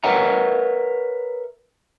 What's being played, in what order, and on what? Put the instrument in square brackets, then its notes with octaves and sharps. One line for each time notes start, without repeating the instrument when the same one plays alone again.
[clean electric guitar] A#4 B4 C#5 E5 F#5 A#5